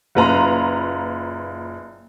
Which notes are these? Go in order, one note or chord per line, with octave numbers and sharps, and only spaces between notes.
F#1 A#2 B4 F5 A#5 C6